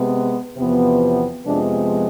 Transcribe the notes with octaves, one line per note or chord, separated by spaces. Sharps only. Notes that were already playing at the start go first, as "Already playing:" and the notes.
Already playing: C3 G#3 B3
E2 C3 F3 B3
F2 C3 F3 G#3 B3 D4